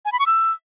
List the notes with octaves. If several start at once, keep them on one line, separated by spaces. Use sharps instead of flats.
G#5
B5
C#6
E6